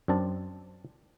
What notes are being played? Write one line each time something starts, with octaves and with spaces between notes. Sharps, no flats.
F#2 C4 D4 A5